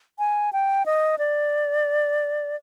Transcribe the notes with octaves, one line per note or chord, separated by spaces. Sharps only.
G#5
G5
D#5
D5